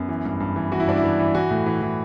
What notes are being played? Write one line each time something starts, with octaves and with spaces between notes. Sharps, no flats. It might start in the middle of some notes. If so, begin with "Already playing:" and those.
Already playing: F#2 B3
E3
G2
G2
E3
E3 F#4
E4
G2 D4
E4
E3
E3
E3 F#4
A2
E3
E3